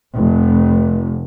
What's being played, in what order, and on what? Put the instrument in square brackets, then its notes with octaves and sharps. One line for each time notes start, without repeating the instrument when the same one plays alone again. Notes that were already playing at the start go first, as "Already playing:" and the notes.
[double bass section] F1